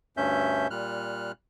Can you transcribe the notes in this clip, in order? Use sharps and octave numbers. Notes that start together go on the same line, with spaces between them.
D2 G2 C#4 E5 G6
A#2 G3 F6 F#6